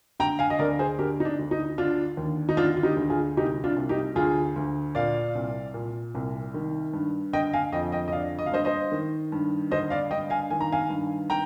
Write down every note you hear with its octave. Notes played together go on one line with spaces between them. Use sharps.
D3 G5 A#5
F5 G#5
D#5
D2 A#4 D5
G#4 C5
D3 G4 A#4
D#4
D4
D2
D#4
D3 D4 F4
D#2
D#4
D3 D4 F4
F4
D#4 G4
D2
F4 G#4
C2 D#4 G4
D4 F4
C2
D#4 G4
D2 F4 G#4
D2
A#2 D5 F5
C2
A#2
C2
D#3
G2
D3 D#5 G5
F5 G#5
F2 D#5 G5
D#5 G5
D#5
D3 D5 F5
D#5
F5
G2 C5 D#5
C5 D#5
D#3
G2
D3 C5 D#5
D5 F5
G2 D#5 G5
F5 G#5
D#3 G#5
A#5
F5 G#5
G2
G5 A#5